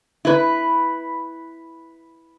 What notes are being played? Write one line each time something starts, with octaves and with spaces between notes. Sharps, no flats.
E4 B4